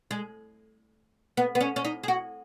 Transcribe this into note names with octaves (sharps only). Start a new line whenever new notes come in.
G#3
B3
B3
C#4
C#4
D#4
G#4
F#4